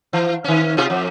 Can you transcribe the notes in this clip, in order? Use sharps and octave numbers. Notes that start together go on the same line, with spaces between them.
E3
D#3 C#4
C3 F4 G#4
F2